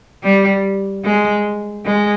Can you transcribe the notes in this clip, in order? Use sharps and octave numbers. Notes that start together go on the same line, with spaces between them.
G3
G#3
G#3